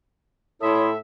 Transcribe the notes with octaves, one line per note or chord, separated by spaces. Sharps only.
A2 E4 A4 C#5 E5 C6 D#6